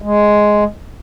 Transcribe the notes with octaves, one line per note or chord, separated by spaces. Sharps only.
G#3